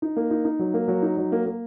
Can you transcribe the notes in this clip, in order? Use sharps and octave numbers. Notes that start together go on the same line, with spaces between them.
D#4
A#3
D#4
D#4
F#3
A#3
F#3
D#4
F#3
A#3
A#3